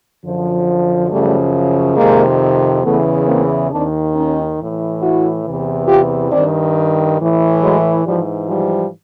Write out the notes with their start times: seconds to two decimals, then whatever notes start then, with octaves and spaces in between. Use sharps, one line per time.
0.23 F#2 D3 F3
1.09 F#2 C#3 F3 G3 A3
1.96 F2 C3 D#3 G#3 A#3
2.83 E2 C#3 E3 A3 B3
3.26 A#3 C4
3.70 D#2 D#3 C4 D4
4.14 C#4 D#4
4.57 A2 E3
5.01 E4 F#4
5.45 E2 C3 E3
5.87 F4 G4
6.31 G2 D#3 C4 D4
7.18 A2 E3
7.62 F#3 G#3
8.04 G#2 E3 F3 G3
8.48 F3 G3